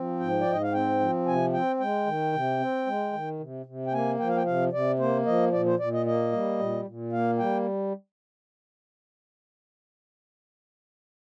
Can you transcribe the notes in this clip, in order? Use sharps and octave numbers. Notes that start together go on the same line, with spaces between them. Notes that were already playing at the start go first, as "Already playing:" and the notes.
Already playing: F3 C4
G#2 G5
D5
G#2 D#5
F5
C4 G5
F3
C3 G#5
C4 G5
G#3 G5
D#3
C3
C4
G#3
D#3
C3
C3
G5
A#3 G#5
F3 G5
F5
G5
C3 F5
C3 D5
A#3 C5
F3 D#5
A#2 D5
C5
A#2 D5
D#5
A#3 D#5
G3
A#2
A#2
A#3 F5
G3 G5